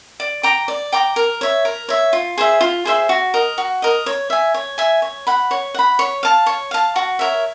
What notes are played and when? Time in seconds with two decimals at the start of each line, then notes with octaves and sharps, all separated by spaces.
0.20 D5
0.43 G5 A#5 D6
0.68 D5
0.93 G5 A#5 D6
1.16 A#4
1.41 C#5 E5
1.65 A#4
1.89 C#5 E5
2.13 F4
2.38 G#4 C5 E5
2.61 F4
2.85 G#4 C5 E5
3.09 F#4
3.34 A#4 D#5
3.58 F#4
3.82 A#4 D#5
4.06 C#5
4.30 E5 G#5
4.54 C#5
4.78 E5 G#5
5.02 C#5
5.27 F#5 B5
5.51 C#5
5.74 F#5 B5
5.99 C#5
6.23 F5 A5
6.46 C#5
6.71 F5 A5
6.96 F#4
7.19 A#4 C#5 E5